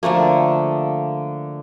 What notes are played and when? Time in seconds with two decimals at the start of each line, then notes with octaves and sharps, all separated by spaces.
0.03 D3 F3 A3 A#3